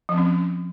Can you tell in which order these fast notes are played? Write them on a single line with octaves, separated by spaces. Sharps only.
F3 C4 C#4